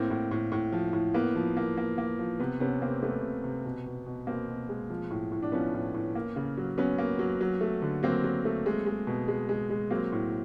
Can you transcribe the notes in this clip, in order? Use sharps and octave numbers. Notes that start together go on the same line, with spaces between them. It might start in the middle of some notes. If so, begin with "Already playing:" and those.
Already playing: A2 A#3 C4
A2
A2
A2
F3
A2
A#3 B3
F3
A#3
A#3
A#3
F3
C3 B3
C3 B3 C#4
C3 A#3 C4
A3 B3
C3
C3
B2
B2
B2
B2 A#3 C4
B2
G#3
F3
A2
A2
D4
F3 B3 C#4
A2
A2
A#3
C#3
F#3
F#3 B3 C#4
A#3
F#3
F#3
A3
D3
F#3 A#3 C4
F#3
A3
G#3
G#3
B2
G#3
G#3
G#3
F#3 A#3 C4
A2